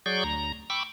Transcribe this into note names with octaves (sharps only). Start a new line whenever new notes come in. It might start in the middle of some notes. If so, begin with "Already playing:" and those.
F#3 G#4 D5 C#6 G6
D2 A#5
G5 B5 C#6 D6 E6